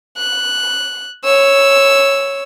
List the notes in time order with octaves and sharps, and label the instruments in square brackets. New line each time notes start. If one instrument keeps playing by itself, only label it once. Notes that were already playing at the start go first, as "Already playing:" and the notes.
[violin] F#6
C#5 E6